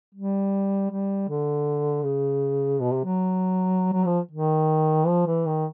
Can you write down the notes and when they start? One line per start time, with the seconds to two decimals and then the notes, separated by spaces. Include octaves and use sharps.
0.15 G3
0.90 G3
1.29 D3
2.04 C#3
2.81 B2
2.92 C3
3.05 F#3
3.94 F#3
4.06 F3
4.31 D#3
5.07 F3
5.27 E3
5.46 D#3